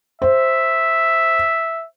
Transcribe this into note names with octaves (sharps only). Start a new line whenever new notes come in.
C5 E5